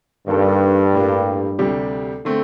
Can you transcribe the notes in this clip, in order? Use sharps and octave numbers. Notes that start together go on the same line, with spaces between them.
G2 D#3 A#3 D4 A4
A2 G3 A#3
D2 C3 G3 D4 G4
D3 A3 C4